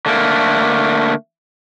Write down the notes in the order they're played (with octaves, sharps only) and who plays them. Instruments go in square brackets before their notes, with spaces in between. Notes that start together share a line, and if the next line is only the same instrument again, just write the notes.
[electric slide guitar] D3 A3 A#3